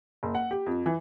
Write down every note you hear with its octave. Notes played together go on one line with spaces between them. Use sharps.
F#1
F#5
G4
F2
E3